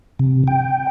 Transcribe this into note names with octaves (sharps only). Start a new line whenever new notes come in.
C3
G5